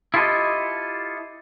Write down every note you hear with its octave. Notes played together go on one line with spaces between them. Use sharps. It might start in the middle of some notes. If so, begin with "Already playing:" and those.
E4 F4 G4 A4 B4 D#5